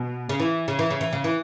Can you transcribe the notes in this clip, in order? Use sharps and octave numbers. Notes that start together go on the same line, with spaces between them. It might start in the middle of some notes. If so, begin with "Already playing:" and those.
Already playing: B2
C#3
E3
C#3
E3
C#3
E3
C#3
E3